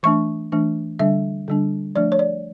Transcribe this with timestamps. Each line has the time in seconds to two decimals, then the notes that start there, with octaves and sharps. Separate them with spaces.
0.03 E3 A3 D4 C#6
0.52 E3 A3 D4
0.99 D3 G3 D4 E5
1.48 D3 G3 D4
1.96 F3 A3 D4 D5
2.12 C#5
2.19 D5